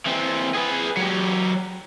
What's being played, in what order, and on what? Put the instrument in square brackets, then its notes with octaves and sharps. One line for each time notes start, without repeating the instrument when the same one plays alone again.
[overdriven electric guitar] E3 C4
G#4 B4
F#3 G4